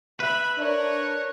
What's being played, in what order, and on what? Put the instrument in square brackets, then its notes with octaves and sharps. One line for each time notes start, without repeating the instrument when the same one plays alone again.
[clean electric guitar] B4 [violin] E5 B5
[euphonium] D4 [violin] A#4 C#5